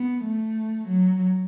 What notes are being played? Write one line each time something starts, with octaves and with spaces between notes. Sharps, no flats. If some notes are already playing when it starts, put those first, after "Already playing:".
Already playing: B3
A3
F#3